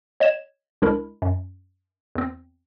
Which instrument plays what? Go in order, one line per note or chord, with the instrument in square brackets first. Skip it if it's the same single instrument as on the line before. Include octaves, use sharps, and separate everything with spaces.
[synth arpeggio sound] C#5 D#5 G#6 E7
C#2 G#3 D4 E4 A#4 B5
F#2
E2 C4